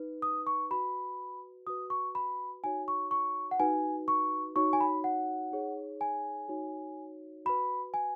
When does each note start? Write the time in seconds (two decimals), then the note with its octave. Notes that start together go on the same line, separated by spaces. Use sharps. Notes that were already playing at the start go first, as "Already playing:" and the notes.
Already playing: D#4 B4
0.22 D#6
0.47 C#6
0.71 F#4 B4 B5
1.67 F#4 B4 D#6
1.90 C#6
2.15 B5
2.64 D#4 F#4 C#5 G#5
2.88 C#6
3.11 C#6
3.51 F#5
3.60 D#4 F#4 B4 G#5
4.08 C#6
4.56 D#4 F#4 C#5 C#6
4.73 G#5
4.81 B5
5.04 F#5
5.52 D#4 G#4 C#5
6.01 G#5
6.48 D#4 F#4 C#5
7.45 F#4 B4 B5
7.94 G#5